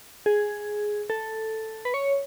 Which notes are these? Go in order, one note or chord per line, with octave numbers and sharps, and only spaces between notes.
G#4
A4
B4
C#5